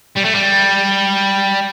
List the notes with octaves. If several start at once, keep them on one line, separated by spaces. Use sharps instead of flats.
G3
A3
G3